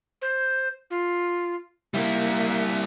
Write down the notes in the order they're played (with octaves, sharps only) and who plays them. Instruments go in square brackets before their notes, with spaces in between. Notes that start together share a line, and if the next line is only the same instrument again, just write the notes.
[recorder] C5
F4
[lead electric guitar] G3 E4 [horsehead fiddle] A#3 [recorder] E5